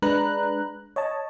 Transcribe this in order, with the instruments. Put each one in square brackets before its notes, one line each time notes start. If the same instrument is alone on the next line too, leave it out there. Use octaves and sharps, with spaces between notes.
[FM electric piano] G#3 D4 B4 A#5 F#6
C#5 D#5 A5